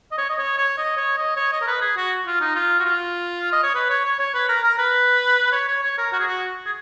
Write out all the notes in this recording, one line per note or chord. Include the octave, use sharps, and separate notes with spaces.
D#5
C#5
D#5
C#5
C#5
D#5
C#5
D#5
C#5
D#5
A#4
B4
G#4
F#4
F4
D#4
F4
F#4
F4
D#5
C#5
B4
C#5
C#5
C#5
B4
A#4
A#4
B4
C#5
C#5
C#5
A#4
F#4
G#4
F#4
G#4